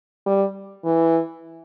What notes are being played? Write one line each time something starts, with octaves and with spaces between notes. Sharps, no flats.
G3
E3